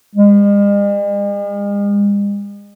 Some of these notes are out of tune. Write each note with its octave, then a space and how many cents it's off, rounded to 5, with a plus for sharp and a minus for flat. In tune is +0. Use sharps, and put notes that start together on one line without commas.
G#3 -45